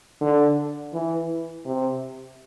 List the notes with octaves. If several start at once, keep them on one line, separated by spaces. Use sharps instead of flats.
D3
E3
C3